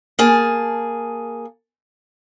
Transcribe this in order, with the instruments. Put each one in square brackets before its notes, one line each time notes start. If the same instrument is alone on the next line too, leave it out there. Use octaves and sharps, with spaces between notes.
[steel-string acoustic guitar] A#3 G#4 A5